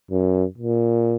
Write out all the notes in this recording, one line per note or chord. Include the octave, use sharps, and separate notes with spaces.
F#2
A#2